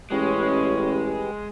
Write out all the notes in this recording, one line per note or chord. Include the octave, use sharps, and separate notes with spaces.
A1 G#3 C#4 G4 B4